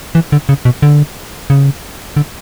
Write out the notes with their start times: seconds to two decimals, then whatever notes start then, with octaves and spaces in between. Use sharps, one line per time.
0.15 E3
0.32 D3
0.49 C#3
0.65 B2
0.82 D3
1.50 C#3
2.17 D3